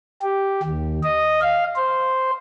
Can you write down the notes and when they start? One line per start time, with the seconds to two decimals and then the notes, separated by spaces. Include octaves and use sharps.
0.22 G4
0.63 D#2
1.03 D#5
1.42 F5
1.76 C5